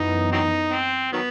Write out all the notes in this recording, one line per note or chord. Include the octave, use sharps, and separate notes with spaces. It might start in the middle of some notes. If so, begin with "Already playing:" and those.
Already playing: F#2 E3 B3 D#4
F#3 C4 D#4
C4
D#3 F#3 B3